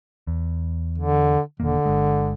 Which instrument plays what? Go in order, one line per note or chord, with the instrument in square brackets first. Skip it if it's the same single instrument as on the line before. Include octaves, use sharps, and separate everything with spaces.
[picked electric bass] E2
[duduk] D3
[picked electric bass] E1 D#3 A#3 [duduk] D3
[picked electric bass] G1 G#3